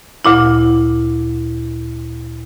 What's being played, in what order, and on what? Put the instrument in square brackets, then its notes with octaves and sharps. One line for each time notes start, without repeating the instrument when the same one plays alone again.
[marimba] D2 A#2 E4